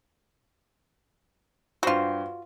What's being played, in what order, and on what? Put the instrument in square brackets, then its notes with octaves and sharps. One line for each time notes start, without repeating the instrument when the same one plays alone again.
[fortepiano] G2 C5 [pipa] F4 F#4